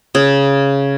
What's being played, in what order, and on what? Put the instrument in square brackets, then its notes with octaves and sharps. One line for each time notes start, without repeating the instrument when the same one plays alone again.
[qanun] C#3